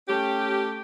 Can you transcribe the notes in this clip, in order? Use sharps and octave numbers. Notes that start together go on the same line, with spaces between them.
A3 C#4 G4